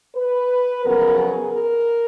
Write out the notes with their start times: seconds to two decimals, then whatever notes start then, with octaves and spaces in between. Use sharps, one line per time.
0.15 B4
0.84 F2 C#3 F#3 B3 A#4
1.18 G#4
1.52 A#4